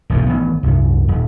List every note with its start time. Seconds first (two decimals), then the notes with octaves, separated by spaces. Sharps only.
0.10 E1 B1 G#2
0.27 A1 D#3 B3
0.63 C2 F#2
1.08 D#1